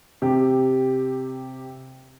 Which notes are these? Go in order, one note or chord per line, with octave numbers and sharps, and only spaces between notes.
C3 G4